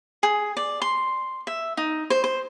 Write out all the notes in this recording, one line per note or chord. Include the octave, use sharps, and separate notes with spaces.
G#4
D5
C6
E5
D#4
C5
C5